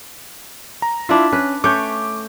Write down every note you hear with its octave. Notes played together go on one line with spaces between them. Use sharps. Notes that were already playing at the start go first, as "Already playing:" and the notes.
A#5
D4 E4 F4 E5
C#4 B4
A3 C#4 B4 D6 G6